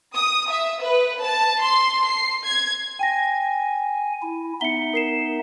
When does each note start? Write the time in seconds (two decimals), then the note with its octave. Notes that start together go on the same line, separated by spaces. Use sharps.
0.14 D#6
0.49 E5
0.80 B4
1.20 A5
1.61 C6
2.06 C7
2.44 G#6
2.99 G5 G#5 A#6
4.22 E4
4.61 B3 D#4 E5 C#7 G7
4.94 A#4 C7 E7